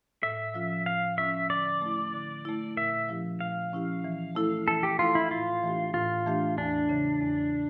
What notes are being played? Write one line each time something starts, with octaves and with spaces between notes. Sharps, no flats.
A2 E5
F3 C#4 F4
A2 F5
F3 C#4 F4 E5
D3 D5
A3 E4
D3
A3 E4
A#2 E5
F3 C#4 E4 G4
A#2 F5
F3 C#4 E4 G4
E3
A3 E4 A4
E3 A4
G4
A3 E4 F4 A4
E4
A2 F4
E3 A3 D4 G4
A2 F4
E3 A3 D4 G4
E2 D4
C#3 E3
E2
C#3